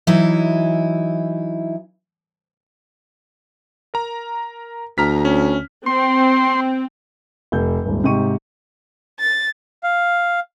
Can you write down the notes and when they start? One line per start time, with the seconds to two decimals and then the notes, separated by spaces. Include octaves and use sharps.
0.07 E3 F#3 D#4 E4
3.94 A#4 A#5
4.98 D2 A#5 F6 B6
5.25 C#4
5.86 C4 C6
7.52 F1 G6
7.85 D#1 G#1
8.04 G#2 C3 D#4 G4 C#6 D#7
9.20 A6
9.83 F5